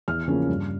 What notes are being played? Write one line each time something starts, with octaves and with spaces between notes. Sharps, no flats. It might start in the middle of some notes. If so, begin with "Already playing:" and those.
E2 F6
C#3 F3 A#3 C#4
G2